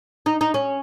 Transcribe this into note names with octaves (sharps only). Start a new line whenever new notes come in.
D#4
D#4
C#4